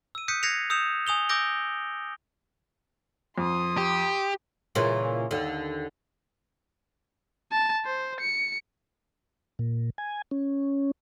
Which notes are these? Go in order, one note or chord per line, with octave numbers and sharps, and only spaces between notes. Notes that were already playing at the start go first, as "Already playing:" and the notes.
E6 D#7
D#6 F#6 G6 B6 C#7 D#7
F#6 G#6 A#6 C7 C#7 F7
D#6 E6 G6 C#7 E7 F7
G#5 D#6 F7 G7
D6 E6 G6 A#6 D7 G7
F2 C6 D#6
G4
A#2 C#3 E3
D#2 D3
A5
C5
C#7
A#2
G#5
C#4